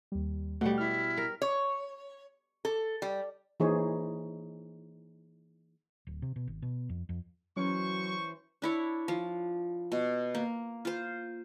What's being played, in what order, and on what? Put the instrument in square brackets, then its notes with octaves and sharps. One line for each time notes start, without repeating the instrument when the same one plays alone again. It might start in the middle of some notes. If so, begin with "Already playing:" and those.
[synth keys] D#2 G3
[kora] B2 G3 [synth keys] A3 [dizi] F#5
[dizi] E4 [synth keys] F6
[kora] A#4
[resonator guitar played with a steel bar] C#5
A4
G3
[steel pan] E3 A#3 D#4 G#4 C5 C#5
[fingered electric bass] D1
C3
B2
G#1
B2
F2
F2
[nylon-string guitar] E3 C#4 [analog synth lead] F#3 [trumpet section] C5 C#6
[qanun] D4 E4 C#5
F3
B2
A#3
F4 C5